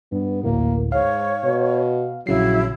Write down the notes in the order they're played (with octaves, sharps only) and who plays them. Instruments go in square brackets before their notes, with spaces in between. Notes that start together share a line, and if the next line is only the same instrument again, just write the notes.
[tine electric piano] G2 [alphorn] B3
[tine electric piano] G#1 D2 A2 [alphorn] A#3
[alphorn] G#2 [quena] C#5 [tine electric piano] F5
[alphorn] B2
[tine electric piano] A#1 C#3 C7 [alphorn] F#3 [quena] E4